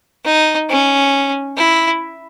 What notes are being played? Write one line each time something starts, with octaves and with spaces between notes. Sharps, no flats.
D#4
C#4
E4